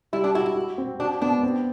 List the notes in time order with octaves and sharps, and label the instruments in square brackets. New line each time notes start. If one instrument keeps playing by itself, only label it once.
[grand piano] G3 [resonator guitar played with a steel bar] E4
[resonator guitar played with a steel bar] D4
[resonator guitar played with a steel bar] E4 [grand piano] F#4
[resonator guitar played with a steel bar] E4
[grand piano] F#4
C4
[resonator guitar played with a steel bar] D4 [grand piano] F#4
[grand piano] B3 [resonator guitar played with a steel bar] D4
[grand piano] C4